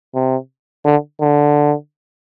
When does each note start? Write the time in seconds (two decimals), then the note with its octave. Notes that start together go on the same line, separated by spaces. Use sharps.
0.15 C3
0.85 D3
1.21 D3